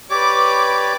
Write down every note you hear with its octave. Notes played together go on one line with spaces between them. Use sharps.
G4 B4 C#5 D5 D6